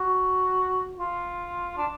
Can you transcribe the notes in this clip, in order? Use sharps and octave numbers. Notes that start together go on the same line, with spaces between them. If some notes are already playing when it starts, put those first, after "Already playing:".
Already playing: F#4
F4
D4